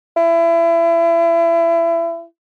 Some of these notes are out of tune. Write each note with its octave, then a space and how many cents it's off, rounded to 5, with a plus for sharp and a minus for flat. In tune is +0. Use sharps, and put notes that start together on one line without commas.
E4 +30